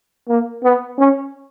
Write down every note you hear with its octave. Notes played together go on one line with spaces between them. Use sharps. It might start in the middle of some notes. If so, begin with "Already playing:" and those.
A#3
B3
C#4